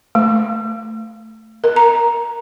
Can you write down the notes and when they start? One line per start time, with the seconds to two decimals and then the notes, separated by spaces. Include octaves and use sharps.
0.15 A3
1.64 A#4
1.76 A#5